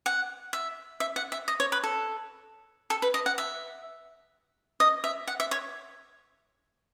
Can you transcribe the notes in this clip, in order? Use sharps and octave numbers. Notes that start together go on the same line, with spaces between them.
F#5
E5
E5
F#5
E5
D#5
C#5
B4
A4
A4
B4
D#5
F#5
E5
D#5
E5
F#5
E5
C#5